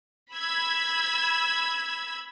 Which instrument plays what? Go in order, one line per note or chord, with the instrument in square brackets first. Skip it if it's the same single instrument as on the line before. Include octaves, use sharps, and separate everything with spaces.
[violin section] B5 E6 G#6